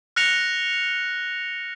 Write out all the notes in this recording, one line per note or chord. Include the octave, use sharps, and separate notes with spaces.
F6 F#6 A#6 C#7 F7